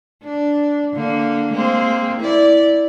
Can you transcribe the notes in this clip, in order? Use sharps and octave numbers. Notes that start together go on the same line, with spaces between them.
D4
D3 A#3
G#3 A#3 C4
E4 D5